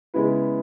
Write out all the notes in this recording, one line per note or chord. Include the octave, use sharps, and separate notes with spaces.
C#3 G#3 B3 E4 B4